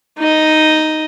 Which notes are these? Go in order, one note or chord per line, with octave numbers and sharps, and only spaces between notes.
D#4 D#5